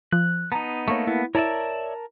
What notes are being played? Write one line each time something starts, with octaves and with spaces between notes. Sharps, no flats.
F3 F#6
B3 D#4 A5 A#5
A3 A#3 C#5 C#6
B3 E4
E4 A#4 C#5 D5 E5 A5